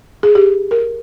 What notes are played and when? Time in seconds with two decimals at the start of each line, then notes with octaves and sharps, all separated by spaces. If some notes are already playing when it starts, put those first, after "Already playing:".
0.23 G#4
0.35 G4
0.71 A#4